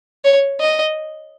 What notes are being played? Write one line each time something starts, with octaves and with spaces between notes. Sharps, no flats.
C#5
D#5